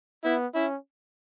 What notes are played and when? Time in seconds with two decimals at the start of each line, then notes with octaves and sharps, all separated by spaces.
0.25 B3 E4
0.55 C#4 E4